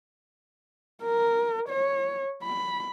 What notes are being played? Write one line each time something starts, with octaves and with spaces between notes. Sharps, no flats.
A#4
C#5
B5